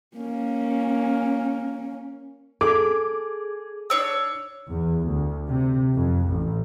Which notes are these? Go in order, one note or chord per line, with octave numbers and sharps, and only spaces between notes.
A#3 C#4
G#4 A4 D6
D4 C#5 E6
E2
D2
C3
F2
A1